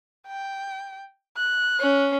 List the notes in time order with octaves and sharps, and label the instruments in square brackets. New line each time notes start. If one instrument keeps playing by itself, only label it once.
[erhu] G5
F#6
[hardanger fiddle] C#4